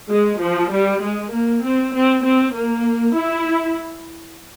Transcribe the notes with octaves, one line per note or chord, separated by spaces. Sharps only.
G#3
F3
G3
G#3
A#3
C4
C4
C4
A#3
E4